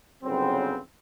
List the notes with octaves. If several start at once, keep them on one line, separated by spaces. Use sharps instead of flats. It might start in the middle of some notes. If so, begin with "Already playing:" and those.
G1 C#3 F#3 B3 C4